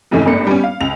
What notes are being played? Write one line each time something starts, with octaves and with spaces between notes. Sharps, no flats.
F2 G#2 C#3 E3 A3 C#4
G#1 G2 A3 A#3 C#7
G3 B3 C#4
F5
C#2 F7